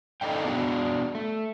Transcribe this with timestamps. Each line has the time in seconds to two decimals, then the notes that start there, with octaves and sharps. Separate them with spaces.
0.21 D#4 A4 D5 D#5 F5 G5
0.45 B3 D4 F#4 G#4
1.15 A3